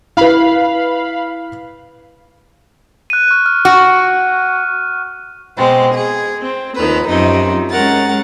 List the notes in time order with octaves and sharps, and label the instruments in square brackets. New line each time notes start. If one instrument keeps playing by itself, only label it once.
[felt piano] E4 B4 [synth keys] F5 B5
[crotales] F#6 D#7
C#6 F6
F6
[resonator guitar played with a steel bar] F#4
[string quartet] B2 G#3 C4
G#4
C4
D#2 D#3 F3 B4
F#2 C3 F3 D#4
G#3 C#4 A#4 F#5 A6